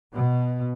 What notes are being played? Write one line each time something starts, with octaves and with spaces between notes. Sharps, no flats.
B2